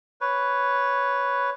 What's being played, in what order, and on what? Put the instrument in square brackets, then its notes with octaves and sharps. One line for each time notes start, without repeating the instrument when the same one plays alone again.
[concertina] B4 C#5